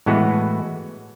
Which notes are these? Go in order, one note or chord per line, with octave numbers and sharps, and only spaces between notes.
A2 E3 G#3 B3 F#4